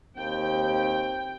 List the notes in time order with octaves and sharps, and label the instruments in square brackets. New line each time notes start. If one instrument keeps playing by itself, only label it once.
[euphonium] D#2 [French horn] C4 [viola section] G5